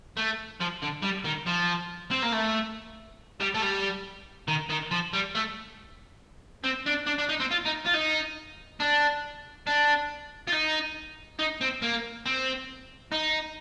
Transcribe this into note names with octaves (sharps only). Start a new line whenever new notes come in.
A3
F3
D3
G3
D#3
F3
C4
A#3
A3
G3
A3
G3
D#3
D#3
F3
G3
A3
C4
D4
D4
D4
D#4
C4
F4
D#4
F4
D#4
D4
D4
F4
D#4
D#4
C4
A#3
C4
D#4